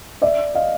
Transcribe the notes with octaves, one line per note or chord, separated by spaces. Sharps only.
D5 E5
D#5 F5